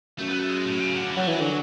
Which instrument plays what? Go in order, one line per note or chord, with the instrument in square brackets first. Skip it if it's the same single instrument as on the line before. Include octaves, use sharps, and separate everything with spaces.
[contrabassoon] F#2 [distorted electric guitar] A3
[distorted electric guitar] B3
A3
G#3
A2
C#3
D3
E3
[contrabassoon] F#3 [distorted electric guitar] A3
[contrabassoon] E3 [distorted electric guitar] G#3
[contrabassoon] D3 [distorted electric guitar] F#3